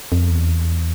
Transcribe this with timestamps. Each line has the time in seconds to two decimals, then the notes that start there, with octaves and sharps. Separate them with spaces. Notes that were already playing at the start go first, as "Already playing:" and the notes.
0.12 F2
0.30 E2